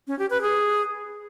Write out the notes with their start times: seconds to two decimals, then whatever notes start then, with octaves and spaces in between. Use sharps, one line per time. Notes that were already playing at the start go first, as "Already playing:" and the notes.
0.07 C#4
0.19 G4
0.30 B4
0.42 G#4